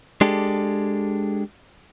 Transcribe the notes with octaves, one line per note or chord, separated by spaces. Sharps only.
G#3 D4 G4 A4